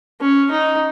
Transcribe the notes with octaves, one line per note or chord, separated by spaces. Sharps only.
C#4
D#4